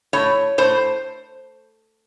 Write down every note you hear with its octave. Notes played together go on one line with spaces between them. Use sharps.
A2 C#5
A2 C5